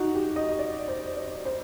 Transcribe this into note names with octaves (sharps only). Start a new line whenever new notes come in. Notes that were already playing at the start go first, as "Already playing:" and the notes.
Already playing: D#4 F#4
G4
D#5
D5
C5
D5
C5